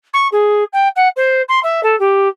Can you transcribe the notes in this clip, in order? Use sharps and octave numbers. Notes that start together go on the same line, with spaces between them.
C#6
G#4
G5
F#5
C5
C6
E5
A4
G4